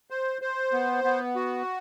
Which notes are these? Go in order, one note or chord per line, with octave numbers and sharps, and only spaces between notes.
C5
C5
B3
B3
F#4